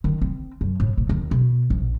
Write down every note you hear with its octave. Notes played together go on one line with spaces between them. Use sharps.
D#3
C4
F#2
A2
A#2
D#2
B2
A#1